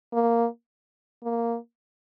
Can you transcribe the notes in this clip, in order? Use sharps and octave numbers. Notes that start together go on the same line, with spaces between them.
A#3
A#3